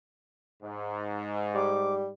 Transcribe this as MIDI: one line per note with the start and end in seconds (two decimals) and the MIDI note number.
0.63 2.12 44
1.55 2.09 55
1.55 1.94 86